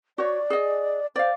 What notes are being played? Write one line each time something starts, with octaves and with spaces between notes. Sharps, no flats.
F#4 C#5 D5
G#4 D#5
C5 D5 F5